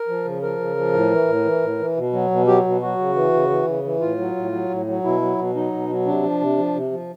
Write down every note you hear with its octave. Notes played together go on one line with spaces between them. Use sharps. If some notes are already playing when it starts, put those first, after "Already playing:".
Already playing: A#4
F3
C#3
F3 A#4
C#3
F3
A2
E3
A2
E3
A2
E3
B2
F#3
B2
F#3 G4
B2
F#3 F#4
C#3
E3
C#3
E3
C#3
E3
A2 F4
F#3
A2
F#3
A2
F#3
B2 E4
F#3
B2
F#3 D#4
B2
F#3
C3 D4
F3
C3
F3
C3
F3